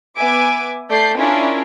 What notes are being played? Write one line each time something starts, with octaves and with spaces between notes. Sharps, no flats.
B3 E5 G#5 D6 D7
A3 D5 G6 C7
C#4 D4 E4 F4 G#4 A#4